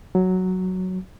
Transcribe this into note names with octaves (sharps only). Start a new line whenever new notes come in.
F#3